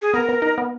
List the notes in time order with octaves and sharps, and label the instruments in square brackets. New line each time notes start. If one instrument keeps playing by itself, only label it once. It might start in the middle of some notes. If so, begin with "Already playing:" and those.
[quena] G#4
[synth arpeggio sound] B3 [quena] A#4
[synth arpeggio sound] B3
D#4
B3